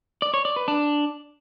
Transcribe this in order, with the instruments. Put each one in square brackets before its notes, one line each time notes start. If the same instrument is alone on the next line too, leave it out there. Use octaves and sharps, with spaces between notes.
[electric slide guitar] D5
C#5
D5
B4
D4